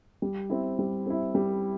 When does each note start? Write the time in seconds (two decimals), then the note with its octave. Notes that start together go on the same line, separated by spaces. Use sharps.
0.22 G3
0.50 C4 E4
0.79 G3
1.06 C4 E4
1.35 G3